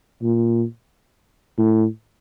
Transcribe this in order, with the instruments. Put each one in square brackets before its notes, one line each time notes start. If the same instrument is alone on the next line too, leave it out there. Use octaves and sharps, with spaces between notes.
[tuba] A#2
A2